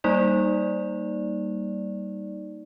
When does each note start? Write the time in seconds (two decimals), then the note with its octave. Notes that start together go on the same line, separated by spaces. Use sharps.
0.04 G3 A#3 D#4 D5